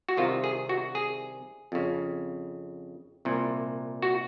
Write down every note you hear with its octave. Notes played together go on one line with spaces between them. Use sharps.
F#4
C2 C3 D#3 F4
G#4
F#4
G#4
F2 C#3
C2 A#2
F#4